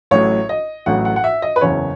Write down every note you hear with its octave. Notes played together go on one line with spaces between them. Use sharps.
A1 A2 F#3 C#5
D#5
A1 A2 F#3 F#5
F#5
F#5
E5
D#5
B4
F#1 E2 C#3 C#5